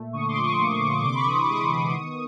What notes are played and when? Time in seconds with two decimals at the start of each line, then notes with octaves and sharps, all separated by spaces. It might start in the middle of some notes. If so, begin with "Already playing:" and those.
Already playing: A#2 A3
0.13 D3 C#6 D#6
0.28 C6 D6
0.36 F3
0.43 C#6 D#6
0.59 A#3
0.81 D3
1.03 C3 C6 D6
1.15 B5 C#6
1.26 E3 C#6 D#6
1.48 G#3 C#6 D#6
1.71 B3
1.94 D#3